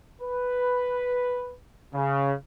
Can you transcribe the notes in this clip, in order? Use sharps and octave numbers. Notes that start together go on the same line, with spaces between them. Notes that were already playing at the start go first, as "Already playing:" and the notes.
B4
C#3